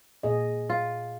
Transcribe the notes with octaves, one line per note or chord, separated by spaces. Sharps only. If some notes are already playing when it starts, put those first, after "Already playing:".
A#2 G#4 D#5
F4